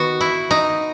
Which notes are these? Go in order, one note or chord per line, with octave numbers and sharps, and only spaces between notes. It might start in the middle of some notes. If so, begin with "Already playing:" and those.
Already playing: D#3 B3 F#4
E4
D#4